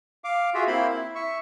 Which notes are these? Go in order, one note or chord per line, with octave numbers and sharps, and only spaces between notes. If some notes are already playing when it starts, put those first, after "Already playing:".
F5 D6
F4 F#4 G#4 E5
A#3 C4 E4 C5 B5
E4
E5 C#6